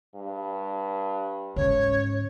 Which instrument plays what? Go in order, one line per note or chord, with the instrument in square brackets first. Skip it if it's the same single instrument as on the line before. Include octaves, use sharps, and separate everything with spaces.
[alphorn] G2
[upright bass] G#2 C#3 [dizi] C#5